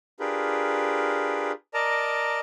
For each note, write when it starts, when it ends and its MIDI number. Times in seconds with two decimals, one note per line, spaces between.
0.20 1.52 62
0.20 1.52 65
0.20 1.52 67
0.20 1.52 68
0.20 1.52 70
0.20 1.52 71
1.74 2.40 70
1.74 2.40 74
1.74 2.40 75
1.74 2.40 81
1.74 2.40 82